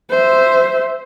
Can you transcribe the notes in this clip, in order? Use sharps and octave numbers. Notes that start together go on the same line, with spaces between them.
C5 E5